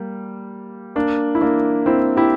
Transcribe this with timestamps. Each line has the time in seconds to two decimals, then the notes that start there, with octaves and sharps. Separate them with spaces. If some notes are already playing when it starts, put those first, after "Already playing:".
Already playing: G3 A#3
0.96 A#3 D4
1.35 E4
1.41 A#3 D4
1.86 C4 E4
2.16 E4 G4